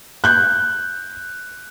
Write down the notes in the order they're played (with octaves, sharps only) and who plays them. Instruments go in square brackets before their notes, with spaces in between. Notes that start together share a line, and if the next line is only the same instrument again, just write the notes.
[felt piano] F#6 G6